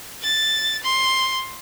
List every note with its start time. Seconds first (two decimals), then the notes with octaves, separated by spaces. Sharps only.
0.22 A6
0.83 C6